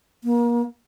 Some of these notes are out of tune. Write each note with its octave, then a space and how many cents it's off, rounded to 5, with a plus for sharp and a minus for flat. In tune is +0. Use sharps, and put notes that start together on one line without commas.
A#3 +35